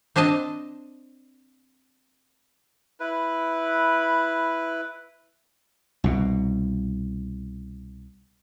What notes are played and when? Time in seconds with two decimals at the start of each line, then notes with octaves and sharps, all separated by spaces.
0.16 C4 D4 C5 D#5 A5
3.00 E4 B4
6.04 C2 B2